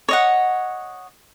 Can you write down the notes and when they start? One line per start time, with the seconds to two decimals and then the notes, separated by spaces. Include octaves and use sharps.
0.09 C#5 D#5 F#5